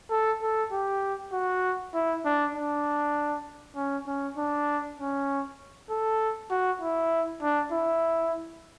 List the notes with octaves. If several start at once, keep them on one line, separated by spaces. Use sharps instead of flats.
A4
A4
G4
F#4
E4
D4
D4
C#4
C#4
D4
C#4
A4
F#4
E4
D4
E4